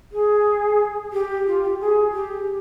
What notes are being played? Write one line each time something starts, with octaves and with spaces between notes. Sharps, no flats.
G#4
G4
F4
G4
G#4
G4